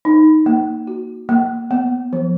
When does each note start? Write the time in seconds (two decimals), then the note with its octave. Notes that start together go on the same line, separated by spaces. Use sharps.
0.05 D#4
0.46 A#3
0.87 F#4
1.29 A#3
1.71 B3
2.13 F3